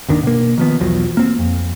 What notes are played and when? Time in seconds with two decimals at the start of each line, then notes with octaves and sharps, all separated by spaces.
0.09 G1 D#2 D#3 D4
0.23 B2 A#3
0.58 D#3 F3 B3
0.80 B1 E2 F3 F#3
1.17 A#3 C4
1.39 F2